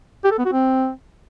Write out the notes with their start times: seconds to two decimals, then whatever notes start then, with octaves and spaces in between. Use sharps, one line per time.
0.24 G4
0.31 A4
0.38 B3
0.45 F#4
0.52 C4